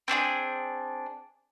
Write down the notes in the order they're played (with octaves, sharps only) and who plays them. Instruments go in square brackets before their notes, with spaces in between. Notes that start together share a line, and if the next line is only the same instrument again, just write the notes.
[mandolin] C4 D4 F#4 G#4